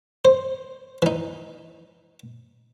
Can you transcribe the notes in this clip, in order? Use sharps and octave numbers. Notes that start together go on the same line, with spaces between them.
C5
E3 D#4